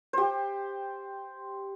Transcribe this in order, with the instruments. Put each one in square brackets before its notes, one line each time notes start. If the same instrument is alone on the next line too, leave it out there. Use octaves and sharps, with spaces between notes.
[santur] G4 C5